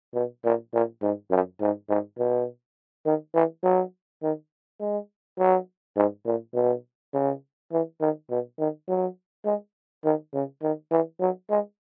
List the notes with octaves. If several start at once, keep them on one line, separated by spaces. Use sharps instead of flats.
B2
A#2
A#2
G#2
F#2
G#2
G#2
B2
D#3
E3
F#3
D#3
G#3
F#3
G#2
A#2
B2
C#3
E3
D#3
B2
D#3
F#3
G#3
D#3
C#3
D#3
E3
F#3
G#3